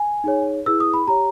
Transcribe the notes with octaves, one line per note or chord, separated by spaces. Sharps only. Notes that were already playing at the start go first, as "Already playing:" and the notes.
Already playing: G#5
D#4 G#4 C#5
E4 G#4 B4 E6
D#6
B5
G4 C#5 A#5